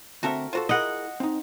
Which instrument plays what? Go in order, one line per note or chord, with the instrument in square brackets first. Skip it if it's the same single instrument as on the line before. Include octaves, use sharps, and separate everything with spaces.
[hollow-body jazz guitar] D2 C4 E5 [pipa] F#4 A4 A#4
[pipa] F4 F#4 [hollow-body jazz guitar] A4 A#4 C5
[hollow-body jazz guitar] E4 G#4 A#4 [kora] D#5 F#5
[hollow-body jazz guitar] C4 D#4